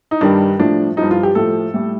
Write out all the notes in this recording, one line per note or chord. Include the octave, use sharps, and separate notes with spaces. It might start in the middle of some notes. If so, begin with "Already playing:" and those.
D#4
G2 D#3 G3 D4
A2 F3 D4
G2 F3 D#4
F4
G4
A2 F3 A4
A2 G3